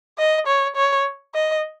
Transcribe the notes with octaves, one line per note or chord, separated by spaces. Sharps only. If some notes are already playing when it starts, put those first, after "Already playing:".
D#5
C#5
C#5
D#5